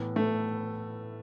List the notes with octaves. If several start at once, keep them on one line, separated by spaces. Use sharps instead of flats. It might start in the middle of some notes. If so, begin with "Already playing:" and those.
Already playing: A2 E3 B3
A3